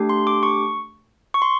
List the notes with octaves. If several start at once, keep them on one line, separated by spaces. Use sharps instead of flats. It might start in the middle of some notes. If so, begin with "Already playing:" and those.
Already playing: A3 D4 G4
C6
D6
C#6
C#6
C6